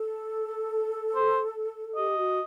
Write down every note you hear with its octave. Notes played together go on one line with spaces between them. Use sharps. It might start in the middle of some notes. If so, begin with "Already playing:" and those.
Already playing: A4
C5
G4 D#5
F#4